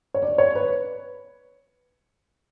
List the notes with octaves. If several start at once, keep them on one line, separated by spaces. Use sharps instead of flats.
C#5
D5
C#5
B4